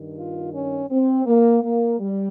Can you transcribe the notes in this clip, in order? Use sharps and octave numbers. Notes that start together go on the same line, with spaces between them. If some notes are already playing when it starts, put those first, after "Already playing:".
Already playing: G2 D#3
F4
C#4
C4
A#3
A#3
G3